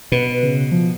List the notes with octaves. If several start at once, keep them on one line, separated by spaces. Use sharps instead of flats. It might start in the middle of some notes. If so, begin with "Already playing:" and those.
B2 B4
C#3
F3